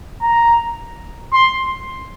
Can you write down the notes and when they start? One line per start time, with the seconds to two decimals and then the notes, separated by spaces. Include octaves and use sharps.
0.22 A#5
1.33 C6